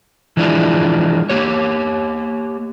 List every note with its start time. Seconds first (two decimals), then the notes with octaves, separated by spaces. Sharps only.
0.37 E3 F3 G#3 D4 E4 F4
1.29 A#3 G4 C#5